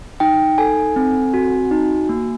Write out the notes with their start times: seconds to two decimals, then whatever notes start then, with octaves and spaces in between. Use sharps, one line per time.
0.20 D#4 G5
0.58 A4 G#5
0.96 C4
1.34 F#4
1.71 D#4
2.09 A#3